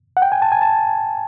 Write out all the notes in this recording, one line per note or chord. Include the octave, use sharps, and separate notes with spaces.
F#5
G5
G#5
A5
G#5
A5